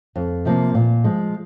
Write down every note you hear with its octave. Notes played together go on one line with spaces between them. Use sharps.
F2
C3 F3 A#3
A#2
F3 G#3